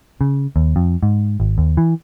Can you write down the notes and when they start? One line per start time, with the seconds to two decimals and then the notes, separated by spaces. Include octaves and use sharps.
0.21 C#3
0.56 D#2
0.76 F2
1.03 G#2
1.40 G#1
1.58 D#2
1.77 E3